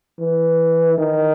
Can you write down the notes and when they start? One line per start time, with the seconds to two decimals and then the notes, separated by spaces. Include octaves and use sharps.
0.20 E3
0.98 D#3